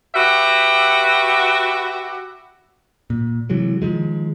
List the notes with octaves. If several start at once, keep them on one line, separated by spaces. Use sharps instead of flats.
F#4 G4 B4 E5 F#5
A#2
C3 E3 F#3 G#3
D#3 F3 G#3